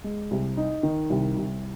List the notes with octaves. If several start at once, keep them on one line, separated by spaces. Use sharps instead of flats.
G#3
C2
D#4
D#3
C2
C2